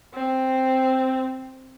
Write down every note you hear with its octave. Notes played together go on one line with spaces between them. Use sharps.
C4